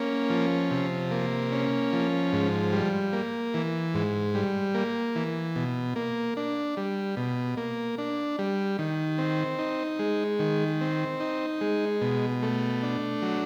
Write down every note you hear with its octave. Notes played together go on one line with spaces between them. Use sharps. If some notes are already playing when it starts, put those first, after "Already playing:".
Already playing: A#3 C#4
F3
C3
A#3
C#4
F3
G#2
G3
A#3
E3
G#2
G3
A#3
E3
B2
A#3
D4
G3
B2
A#3
D4
G3
D#3
C4
D#4
G#3
D#3
C4
D#4
G#3
B2
A3
D4
F#3